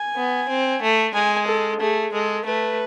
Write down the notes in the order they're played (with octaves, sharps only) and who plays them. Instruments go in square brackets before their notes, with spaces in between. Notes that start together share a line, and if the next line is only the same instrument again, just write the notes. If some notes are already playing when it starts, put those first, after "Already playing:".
Already playing: [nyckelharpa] G#5
[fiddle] B3
C4
A3
[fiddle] G#3 [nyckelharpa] G#5
[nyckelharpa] A4
[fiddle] A3 [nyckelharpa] G#4
[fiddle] G#3 [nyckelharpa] A4
[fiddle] A3 [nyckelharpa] B4